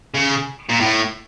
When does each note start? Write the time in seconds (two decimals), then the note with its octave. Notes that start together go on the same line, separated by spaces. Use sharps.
0.14 C#3
0.69 A#2
0.80 A2